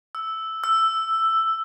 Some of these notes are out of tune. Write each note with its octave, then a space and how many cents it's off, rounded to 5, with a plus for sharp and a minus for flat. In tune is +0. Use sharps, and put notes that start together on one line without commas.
E6 -5
E6 +5